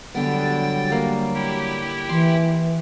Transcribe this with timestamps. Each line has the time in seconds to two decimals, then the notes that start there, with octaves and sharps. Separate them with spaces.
0.15 D3 F#3 G3 B3 G5 A6
0.92 A#3
1.34 E4 G4 G5
2.09 E3 C6